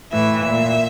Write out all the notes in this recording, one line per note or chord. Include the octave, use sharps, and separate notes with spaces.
A2 E3 E5
A#2 E5